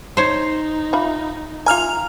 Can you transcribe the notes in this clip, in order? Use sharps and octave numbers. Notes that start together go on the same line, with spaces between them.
D#4 C5 C#5
F4 E5 B5
F4 E5 G#5 A#5 F6 F7